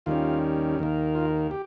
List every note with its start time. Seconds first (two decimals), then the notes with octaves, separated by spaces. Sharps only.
0.06 D#2 D#3 G3 C#4 F4
0.79 D#2 D#3 A#3
1.15 F4
1.51 G4